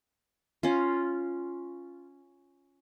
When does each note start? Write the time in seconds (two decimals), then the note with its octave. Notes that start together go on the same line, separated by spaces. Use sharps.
0.63 C#4 F4